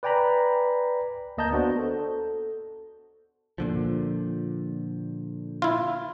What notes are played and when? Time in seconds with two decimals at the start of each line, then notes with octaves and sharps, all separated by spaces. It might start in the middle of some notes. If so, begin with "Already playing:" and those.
0.03 B4 D5 G5 G#5 A#5 B5
1.37 D2 A#3 D#5 A5 A#5 G6
1.51 B3 D4 F#4 C5
1.78 A4
3.58 A#2 D3 F3
5.62 E4 F4